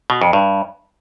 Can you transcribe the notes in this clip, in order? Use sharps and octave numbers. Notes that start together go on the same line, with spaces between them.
B2
F2
G2